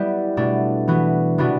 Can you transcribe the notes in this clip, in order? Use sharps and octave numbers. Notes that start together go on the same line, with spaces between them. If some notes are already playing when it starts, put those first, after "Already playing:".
Already playing: G3 B3 E4 G4
B2 A3 D4
E3 B3 F#4
C3 E3 B3 D4 F#4